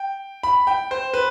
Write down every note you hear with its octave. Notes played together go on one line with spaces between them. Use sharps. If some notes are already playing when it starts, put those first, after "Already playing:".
Already playing: G5
B5
G5
C5
B4